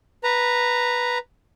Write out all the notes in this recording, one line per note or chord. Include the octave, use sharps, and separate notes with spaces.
B4 A#5